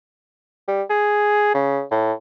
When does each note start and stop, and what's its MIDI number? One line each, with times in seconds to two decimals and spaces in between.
0.68 0.83 55
0.90 1.52 68
1.54 1.83 49
1.91 2.13 45